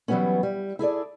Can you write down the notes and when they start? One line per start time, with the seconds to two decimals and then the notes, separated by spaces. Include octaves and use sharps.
0.08 E3 F#3 G3 A#3 B3 C#4
0.43 G3
0.79 E4 G#4 A4 D5